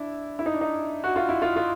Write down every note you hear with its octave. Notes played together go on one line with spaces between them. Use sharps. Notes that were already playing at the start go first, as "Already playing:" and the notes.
Already playing: D4 E4
E4
D#4
D4
D#4
F#4
F4
E4
F4
F4